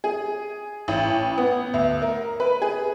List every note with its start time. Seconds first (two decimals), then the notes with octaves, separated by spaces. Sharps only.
0.04 G#4
0.88 A1
1.38 B3
1.74 D2
2.02 A#4
2.40 B4
2.62 G#4